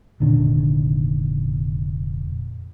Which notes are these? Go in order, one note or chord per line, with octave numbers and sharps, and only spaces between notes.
F1 A#2 D3 D#3